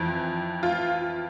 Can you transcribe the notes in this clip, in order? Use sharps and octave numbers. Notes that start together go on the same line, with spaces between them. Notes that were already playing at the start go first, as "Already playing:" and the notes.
Already playing: F2 E3
F4